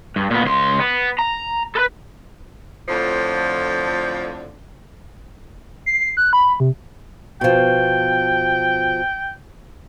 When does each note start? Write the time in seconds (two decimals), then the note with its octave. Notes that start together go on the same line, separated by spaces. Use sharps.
0.16 G2
0.31 A#2 B3
0.45 C#2 C6
0.80 B3
1.19 A#5
1.75 A4 B4
2.88 F2 A2 D3 F3
5.86 C7
6.17 F#6
6.33 B5
6.60 C3
7.41 B2 F3 G5